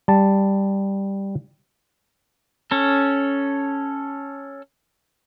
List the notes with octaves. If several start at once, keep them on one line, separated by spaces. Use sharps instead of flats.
G3 A5
C#4 A4